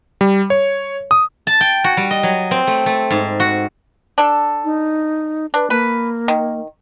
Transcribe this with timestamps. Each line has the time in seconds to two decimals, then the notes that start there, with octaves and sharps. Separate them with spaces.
0.21 G3
0.50 C#5
1.11 D#6
1.47 A5
1.61 G5
1.84 F#4
1.97 G3
2.11 D#5
2.23 F#3
2.51 C4
2.67 A3
2.86 A3
3.11 G#2
3.40 F#4
4.18 D4 A4
4.64 D#4
5.54 D4 B4
5.70 A#3 B4
6.28 D#3